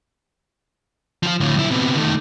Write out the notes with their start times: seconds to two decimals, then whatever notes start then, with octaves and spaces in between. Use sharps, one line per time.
1.23 F3 F4
1.40 D2 A2
1.56 B1 E4
1.71 C3 B3
1.97 D#3 A3